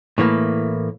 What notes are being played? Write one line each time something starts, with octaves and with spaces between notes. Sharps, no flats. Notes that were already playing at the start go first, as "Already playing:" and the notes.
A2 E3 A#3